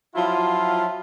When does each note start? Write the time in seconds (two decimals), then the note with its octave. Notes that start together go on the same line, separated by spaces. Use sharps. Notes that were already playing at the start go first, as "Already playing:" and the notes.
0.16 F3 F#3 E4 F4